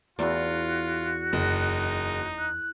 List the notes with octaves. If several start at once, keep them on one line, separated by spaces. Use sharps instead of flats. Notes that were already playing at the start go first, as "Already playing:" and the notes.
E2 F4 F#4
F#1 D#4
F#6